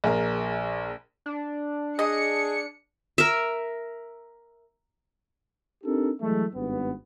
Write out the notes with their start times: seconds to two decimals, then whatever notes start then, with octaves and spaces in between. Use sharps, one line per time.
0.04 A#1 G#4 A#4
1.26 D4
1.99 G#4 D#5 C#7
3.18 A#4 E5
5.84 C4 D4 D#4 G4 A4 A#4
6.21 E3 F#3 G#3 A3
6.54 G#1 G2 B3